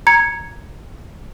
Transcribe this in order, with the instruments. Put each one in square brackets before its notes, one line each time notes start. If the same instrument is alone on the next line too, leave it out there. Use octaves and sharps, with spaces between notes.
[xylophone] A#5 G#6 C#7